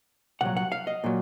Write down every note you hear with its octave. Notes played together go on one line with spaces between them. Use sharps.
C2 A#2 F#3 F#5
F#5
F5
D#5
A#2 F#3